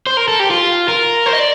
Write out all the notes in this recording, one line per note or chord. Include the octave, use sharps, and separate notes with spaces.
C5
A#4
A4
G4
F4
A#4
C5
D#5
D5